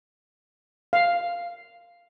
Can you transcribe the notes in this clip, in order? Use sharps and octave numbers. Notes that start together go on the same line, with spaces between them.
F5